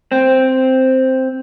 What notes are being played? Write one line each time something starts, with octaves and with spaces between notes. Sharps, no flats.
C4